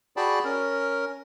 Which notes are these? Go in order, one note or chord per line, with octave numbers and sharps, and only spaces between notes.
F#4 G#4 D5 G5 A5 B5
C#4 A#4